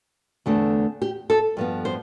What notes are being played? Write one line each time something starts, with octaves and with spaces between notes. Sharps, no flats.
E2 D3 A3 C4
G4
A4
G2 F3 B3
C5